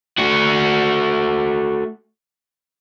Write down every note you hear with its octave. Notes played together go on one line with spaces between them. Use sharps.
A3 F#4